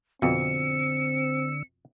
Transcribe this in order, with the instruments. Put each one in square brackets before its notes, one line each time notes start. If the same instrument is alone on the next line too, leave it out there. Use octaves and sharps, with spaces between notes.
[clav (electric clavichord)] F2 B2 [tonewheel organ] D3 E6 [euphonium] C4 [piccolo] C#7